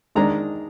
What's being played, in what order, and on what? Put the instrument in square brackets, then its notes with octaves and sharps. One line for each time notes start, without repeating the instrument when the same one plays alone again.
[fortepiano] D#3 G#3 D4 A#5